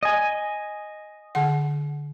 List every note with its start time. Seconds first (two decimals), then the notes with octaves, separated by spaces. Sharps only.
0.03 D#5 G#5
1.35 D3 F#5